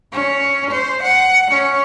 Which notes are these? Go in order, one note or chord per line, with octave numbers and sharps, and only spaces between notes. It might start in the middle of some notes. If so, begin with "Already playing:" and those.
C#4
C5
F#5
C#4